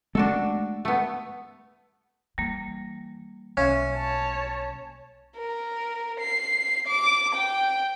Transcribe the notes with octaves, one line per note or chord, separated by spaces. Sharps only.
G#3 A3 D4 F#4 A4
A3 B3
E3 G3 A#3
B1 C#4 E5 F5
C#5 A5
A#4
C7
D6
G5